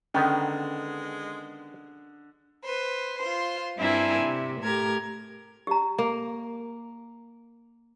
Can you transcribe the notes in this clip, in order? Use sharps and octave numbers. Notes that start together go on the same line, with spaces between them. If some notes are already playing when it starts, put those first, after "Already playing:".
D3 D#3 G#3 B3 C#4
B4 C5
F4 C5
G2 C4 D4 E4 A#4 G#5
C3
A2 G4 A#4 G#6
G4 A#5
A#3